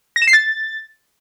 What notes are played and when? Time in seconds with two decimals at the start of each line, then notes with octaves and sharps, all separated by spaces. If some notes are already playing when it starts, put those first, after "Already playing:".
0.16 A#6
0.22 E7
0.27 C7
0.33 A6